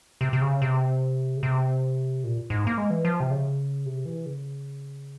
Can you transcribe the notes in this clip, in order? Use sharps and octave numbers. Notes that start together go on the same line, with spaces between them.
C3
C3
C#3
C3
C#3
C3
A#2
G#2
A#3
G#3
E3
F3
C3
C#3
C3
E3
C#3